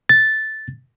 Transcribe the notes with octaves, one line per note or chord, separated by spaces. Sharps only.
A6